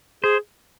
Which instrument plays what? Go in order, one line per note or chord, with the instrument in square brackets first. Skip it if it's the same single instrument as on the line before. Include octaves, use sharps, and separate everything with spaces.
[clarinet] G#4 [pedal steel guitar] C5